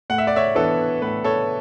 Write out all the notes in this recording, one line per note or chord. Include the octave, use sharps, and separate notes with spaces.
A2 F#5
E5
D5
C#5 E5
E3 B3 D4 A4
A2 B4
A4 C#5